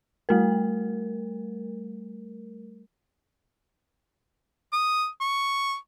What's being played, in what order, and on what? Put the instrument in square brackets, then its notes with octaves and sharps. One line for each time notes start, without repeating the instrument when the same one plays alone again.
[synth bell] G3 A3 A#4
[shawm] D#6
C#6